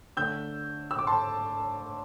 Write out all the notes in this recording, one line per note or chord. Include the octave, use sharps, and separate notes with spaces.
D3 A3 D4 E6 G6
E6
D6
A5 C6